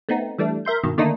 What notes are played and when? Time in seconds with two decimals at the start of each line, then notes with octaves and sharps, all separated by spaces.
0.09 A3 B3 C4 D#4
0.38 E3 G3 A3 D4
0.65 A#4 E5 C6 G6
0.83 G2 B2 D#3
0.98 D3 D#3 A3 A#3 D4 D#4